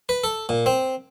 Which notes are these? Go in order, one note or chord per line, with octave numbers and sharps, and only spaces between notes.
B4
A4
A#2
C4